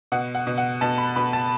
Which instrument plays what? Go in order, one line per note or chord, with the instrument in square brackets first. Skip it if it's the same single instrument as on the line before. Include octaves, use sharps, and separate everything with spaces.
[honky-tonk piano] B2 F#5
F#5
B2
F#5
B2 A5
B5
B2 B5
A5